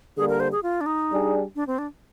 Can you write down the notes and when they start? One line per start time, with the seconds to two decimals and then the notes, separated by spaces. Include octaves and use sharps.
0.17 D3 G3 A#3 G#4
0.29 A#4
0.40 C5
0.52 G#4
0.63 F4
0.81 D4
0.86 D#4
1.10 G3 D4 G#4
1.56 D4
1.67 C4
1.78 D4